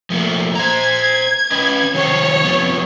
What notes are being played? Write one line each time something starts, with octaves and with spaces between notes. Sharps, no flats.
F3 A3 A#3
C5 A#5 G#6
C#4 B4 D#5
D#3 G3 C5 C#5
F2 G3 B3